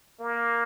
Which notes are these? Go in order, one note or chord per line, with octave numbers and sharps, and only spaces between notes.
A#3